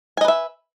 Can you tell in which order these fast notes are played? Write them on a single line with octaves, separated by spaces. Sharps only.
G#5 D#5 B4 E5